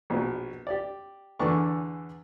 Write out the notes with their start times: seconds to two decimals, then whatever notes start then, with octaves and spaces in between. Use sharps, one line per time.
0.10 A#1 B2
0.67 G4 D5
1.39 E2 D3 E3 D5 C#6